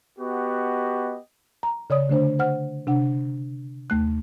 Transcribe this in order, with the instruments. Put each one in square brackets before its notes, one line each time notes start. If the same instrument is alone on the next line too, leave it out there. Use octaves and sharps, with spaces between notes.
[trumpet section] B3 F#4 G4 D#5
[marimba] A#5
C#3 C#5 D5 D#6
D3 A3 D4 C5
C5 F#5 F6
C3 D4 F#5
D#2 A3 F#6